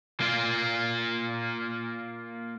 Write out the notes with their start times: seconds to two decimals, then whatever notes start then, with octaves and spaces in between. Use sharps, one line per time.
0.20 A#3 F4